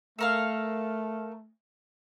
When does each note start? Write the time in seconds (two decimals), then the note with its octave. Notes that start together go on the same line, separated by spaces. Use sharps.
0.19 A3 A4 A#4 F5